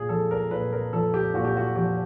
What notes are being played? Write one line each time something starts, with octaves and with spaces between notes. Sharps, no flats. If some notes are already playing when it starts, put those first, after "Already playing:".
Already playing: A#2 G#4
F3 A4
A#4
A#2 B4
A#4
F3 A4
G4
A#2 F#4
G4
F#4
F3 G4